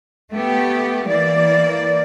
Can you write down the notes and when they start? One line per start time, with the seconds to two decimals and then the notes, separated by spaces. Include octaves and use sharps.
0.31 A3 B3 G4
1.08 E3 A#3 D5